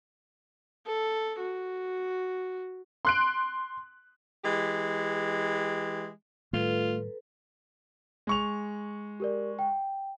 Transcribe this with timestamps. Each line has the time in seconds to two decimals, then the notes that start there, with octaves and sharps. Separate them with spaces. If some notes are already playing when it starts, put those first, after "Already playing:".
0.86 A4
1.40 F#4
3.05 C6 F#6 D7
4.44 E3 G#3 G4
6.53 A2 D#3 G3 A3 F4 A4 B4
8.27 G#3 C#6 F7
9.20 G4 A#4 D5
9.59 G5